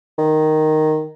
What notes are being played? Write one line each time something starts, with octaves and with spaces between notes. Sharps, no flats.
D#3